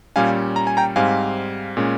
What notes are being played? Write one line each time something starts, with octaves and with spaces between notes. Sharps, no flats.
A#2 G3 C#4 F5 G#5
A#5
G#5
G5 A#5
G#2 G3 C4 F5 G#5
A#2 G#3 C#4